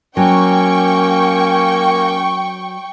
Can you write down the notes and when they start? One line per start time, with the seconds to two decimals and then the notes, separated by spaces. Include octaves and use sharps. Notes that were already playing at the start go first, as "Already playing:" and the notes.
0.17 F#3 A#3 C#4 G5 C#6